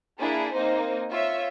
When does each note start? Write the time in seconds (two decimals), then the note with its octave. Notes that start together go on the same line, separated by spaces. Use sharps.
0.20 A#3 D4 E4 G#4
0.52 A#3 C4 D#4 C5
1.10 F4 C#5 E5